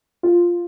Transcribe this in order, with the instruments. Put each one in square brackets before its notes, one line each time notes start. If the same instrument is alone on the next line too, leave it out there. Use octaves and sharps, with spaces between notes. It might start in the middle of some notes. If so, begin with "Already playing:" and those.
[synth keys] F4